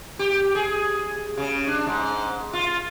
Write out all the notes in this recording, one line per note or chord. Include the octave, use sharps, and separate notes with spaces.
G4
G#4
C#3
D4
G#2
F4